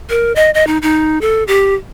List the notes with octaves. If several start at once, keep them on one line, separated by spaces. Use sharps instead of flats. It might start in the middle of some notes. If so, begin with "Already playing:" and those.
A#4
D#5
D#5
D#4
D#4
A4
G4